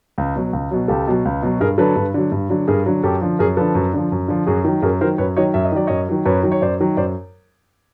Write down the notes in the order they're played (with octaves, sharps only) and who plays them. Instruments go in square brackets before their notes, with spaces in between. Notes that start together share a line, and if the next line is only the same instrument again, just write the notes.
[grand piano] C#2
B2 F#3
C#2
B2 F#3
C#2 G4 A4
B2 F#3
C#2
B2 F#3
G2 G#4 A#4
D3 F#3 A4 B4
G2
D3 F#3
G2
D3 F#3
G2 G#4 A#4
D3 F#3
F#2 G4 A4
D3 F3
F#2 G#4 A#4
D3 F3 A4 B4
F#2
D3 F3
F#2
D3 F3
F#2 F#4 G#4
D#3 F#3
F#2 G#4 A#4
D#3 F#3 A#4 C5
F#2 B4 C#5
D#3 F#3 C#5 D#5
F#2 E5
D#5
D#3 F#3 D5
F#2 C#5 D#5
D#3 F#3
F#2 B4 C#5
D#3 F#3
C#5
F#2 C5 D5
D#3 F#3
F#2 C5 D5